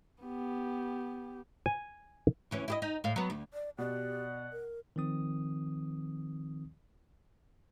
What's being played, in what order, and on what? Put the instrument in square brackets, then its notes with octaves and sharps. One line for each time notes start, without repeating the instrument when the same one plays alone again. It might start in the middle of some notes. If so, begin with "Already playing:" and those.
[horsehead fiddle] B3 G4
[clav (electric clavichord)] G#5
[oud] D2 E3 C#4
E4 G4 D#5
D#4
A2 F5
F#3 B3
D2
[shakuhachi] D5
[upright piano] B2 [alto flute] G4 [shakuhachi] D5 [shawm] F#5
[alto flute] A#4
[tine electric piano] D#3 F3 C4 D#6